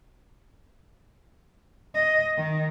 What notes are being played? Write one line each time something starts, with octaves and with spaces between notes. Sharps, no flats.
D#5
D#3